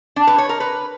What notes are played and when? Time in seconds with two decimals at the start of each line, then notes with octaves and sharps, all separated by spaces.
0.16 D4
0.27 B4
0.38 C#5
0.49 A#4
0.60 B4